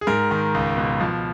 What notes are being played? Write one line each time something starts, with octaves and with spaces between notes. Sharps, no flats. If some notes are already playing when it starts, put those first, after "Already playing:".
G#4
G#2 A#4
D#3
C#2
B2
F3